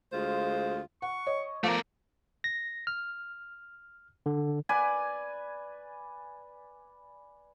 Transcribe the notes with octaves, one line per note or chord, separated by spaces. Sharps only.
D2 G#3 F4 C5 F5
F#5 C#6
C#5 D#5
F3 A3 A#4 D5 F5 D7
A#6
F6
D3
B4 D5 G#5